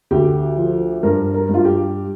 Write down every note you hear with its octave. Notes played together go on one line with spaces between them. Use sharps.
D2 G4
F3
G2 A#4
A#4
G2 F4
G4